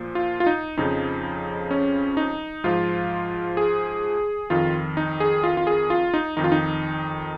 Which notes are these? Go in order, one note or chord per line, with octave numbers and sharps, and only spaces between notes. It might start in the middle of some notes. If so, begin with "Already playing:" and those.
Already playing: A#2 F3
F4
F4
D#4
F2 C#3 F3 D#4
C#4
D#4
G#2 F3 F4
G#4
F2 D#3 F4
D#4
G#4
F4
F4
G#4
F4
D#4
F2 D#3 D#4
F4
D#4